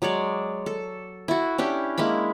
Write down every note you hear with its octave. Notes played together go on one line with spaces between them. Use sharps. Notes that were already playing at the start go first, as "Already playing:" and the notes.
F#3 G#3 C#5 D5
A4
E4 F#4
C#4 D4 E4 G4
G#3 A#3 E4 B5